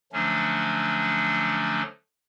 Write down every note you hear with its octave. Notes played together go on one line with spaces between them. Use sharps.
D3 F3 F#3 A3 C#4 D4